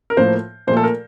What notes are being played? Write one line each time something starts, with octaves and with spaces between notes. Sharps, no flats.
A#4
A2 F3 A#3 C5
A#2 F3 A3 C5
A4
A#4